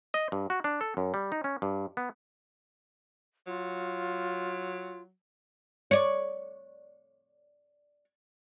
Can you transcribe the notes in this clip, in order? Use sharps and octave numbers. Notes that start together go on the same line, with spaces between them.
D#5
G2
F#4
D4
A4
F#2
G3
D#4
C#4
G2
B3
F#3 F4
C#5 D5